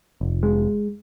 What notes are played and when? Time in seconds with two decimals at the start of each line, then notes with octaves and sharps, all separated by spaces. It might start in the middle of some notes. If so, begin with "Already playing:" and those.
0.21 F1
0.43 G#3